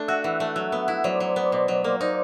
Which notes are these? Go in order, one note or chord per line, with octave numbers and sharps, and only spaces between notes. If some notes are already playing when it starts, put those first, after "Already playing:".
Already playing: A3 D4
F#4 E5 F#5
E3
A3
F#3
B3
E4
F#3 C5 D5
F#3
B3
B2
F#3
A#3
D#4 C5 D5